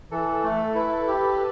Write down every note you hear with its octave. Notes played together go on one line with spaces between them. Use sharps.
E3 A4
A3
E4 B4
G4